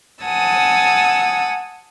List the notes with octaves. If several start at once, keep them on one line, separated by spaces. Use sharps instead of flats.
F#5 G#5 A5 D#6 E6